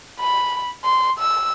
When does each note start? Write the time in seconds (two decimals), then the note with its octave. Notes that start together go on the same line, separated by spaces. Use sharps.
0.20 B5
0.84 C6
1.19 E6